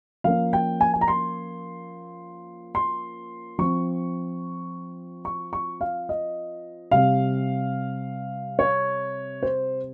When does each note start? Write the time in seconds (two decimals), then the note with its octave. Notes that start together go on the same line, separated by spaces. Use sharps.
0.24 F3 A#3 C#4 F5
0.53 G5
0.81 G#5
0.94 G#5
1.01 A#5
1.08 C6
2.75 C6
3.59 F3 C4 C#6
5.25 C#6
5.53 C#6
5.81 F5
6.09 D#5
6.91 C3 G3 C4 F5
8.59 C#5
9.43 C5